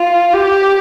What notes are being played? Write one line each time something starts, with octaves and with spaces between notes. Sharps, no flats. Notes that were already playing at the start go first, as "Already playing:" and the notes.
Already playing: F4
G4